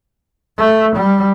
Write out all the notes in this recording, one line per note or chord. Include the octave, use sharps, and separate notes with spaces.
A3
G3